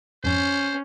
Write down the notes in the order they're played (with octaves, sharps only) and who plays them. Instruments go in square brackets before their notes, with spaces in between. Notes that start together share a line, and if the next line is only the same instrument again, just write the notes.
[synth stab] F2 G#2 [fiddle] C#4 [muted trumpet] C5